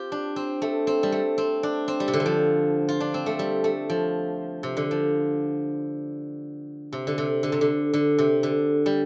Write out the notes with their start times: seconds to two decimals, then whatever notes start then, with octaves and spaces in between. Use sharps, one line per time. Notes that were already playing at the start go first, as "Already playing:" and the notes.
Already playing: C4 F4 G4
0.12 D4
0.36 C4
0.62 A3
0.87 C4
1.03 G3
1.12 A3
1.38 C4
1.63 D4
1.88 C4
2.00 G3
2.08 C3
2.13 D3
2.20 G3
2.26 F3
2.89 F4
3.00 D4
3.14 C4
3.26 A3
3.39 G3
3.64 A3
3.90 F3
4.63 C3
4.77 D3
4.91 F3
6.93 C3
7.07 D3
7.18 C3
7.43 D3
7.52 C3
7.61 D3
7.94 D3
8.18 C3
8.43 D3
8.86 G3